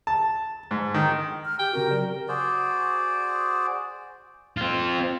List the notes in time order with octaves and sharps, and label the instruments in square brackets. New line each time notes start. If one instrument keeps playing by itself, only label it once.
[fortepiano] A5
G#2
D#3
[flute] F6
[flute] G4 [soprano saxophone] G5
[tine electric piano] C#3 C4 F#4 [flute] A#4
[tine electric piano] F#3 G4 D5
[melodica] F#4 G#4 C5 D5
[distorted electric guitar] C4 F4